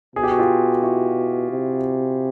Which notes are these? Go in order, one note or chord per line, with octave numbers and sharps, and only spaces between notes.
B2 G#4
G4
F#4
F4 G4
E4 F#4
C3